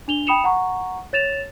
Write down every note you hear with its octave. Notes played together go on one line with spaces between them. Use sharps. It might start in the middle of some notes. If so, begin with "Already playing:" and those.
D4 F7 G7
G5 B5 D#6 C#7 E7 F7
F#5 A#5 C#6
C#5 A6 E7 F7